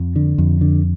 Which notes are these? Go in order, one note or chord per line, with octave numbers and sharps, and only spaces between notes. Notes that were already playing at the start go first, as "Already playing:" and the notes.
Already playing: F2
D3
F2
D3